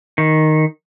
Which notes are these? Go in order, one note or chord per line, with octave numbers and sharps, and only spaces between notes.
D#3